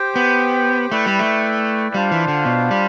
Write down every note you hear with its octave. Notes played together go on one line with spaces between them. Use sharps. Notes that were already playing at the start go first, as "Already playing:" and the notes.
Already playing: G4 C5 G5
B3
A3 E4 B4 D5 G5
G3
A3
G3 D4 F4 C5 F5
E3
D3
B2
G3